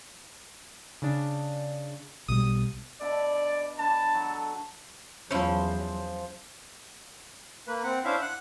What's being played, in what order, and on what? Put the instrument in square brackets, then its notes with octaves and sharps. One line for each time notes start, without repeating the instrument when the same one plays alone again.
[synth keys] C#3 D4
[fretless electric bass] B1 B2 G3 [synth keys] D#6
[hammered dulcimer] B2 D4 E5 [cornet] D5
[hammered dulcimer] D4 G#4 B5 [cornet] A5
[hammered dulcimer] F#3 A4
[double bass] E2 F#3 [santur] F3 C5 [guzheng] C#4 E4
[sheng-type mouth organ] A#3 B4
C4 F#5
C#4 D4 E4 C5 E5 F5
F#5 F#6